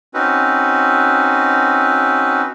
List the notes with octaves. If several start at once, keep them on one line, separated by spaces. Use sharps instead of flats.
C4 C#4 D#4 F#4 B4